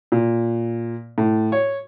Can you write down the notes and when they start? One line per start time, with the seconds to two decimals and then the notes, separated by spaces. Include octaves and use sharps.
0.12 A#2
1.18 A2
1.52 C#5